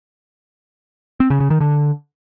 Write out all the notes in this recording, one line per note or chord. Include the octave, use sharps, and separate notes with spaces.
C4
C#3
C#3
D#3
D3